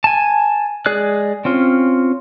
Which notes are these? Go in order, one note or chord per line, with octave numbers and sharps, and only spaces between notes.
G#5 A5
G#3 G#4 D5 F#6
C4 C#4 F4